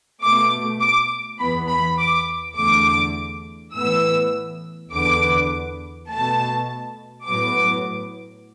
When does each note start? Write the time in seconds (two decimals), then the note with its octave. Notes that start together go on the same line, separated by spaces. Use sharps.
0.22 B2 A3 D6
0.81 D6
1.39 E2 E3 B3 B5
1.69 B5
1.98 D6
2.57 E2 D3 A3 D6
3.74 A2 E3 B3 E6
4.92 E2 D3 B3 D6
6.09 B2 A3 A5
7.27 A2 F#3 B3 D6